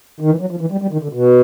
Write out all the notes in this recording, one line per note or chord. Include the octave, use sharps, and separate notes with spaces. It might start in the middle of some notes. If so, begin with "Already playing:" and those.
D#3
E3
F#3
F3
E3
G3
G3
D#3
D3
B2